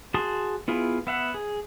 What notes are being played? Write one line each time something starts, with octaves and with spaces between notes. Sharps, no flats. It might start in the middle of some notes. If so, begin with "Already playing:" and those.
F#4 G#4 A5 C6 D#6
B3 E4 F4 G#4
B3 E5 F#5
G#4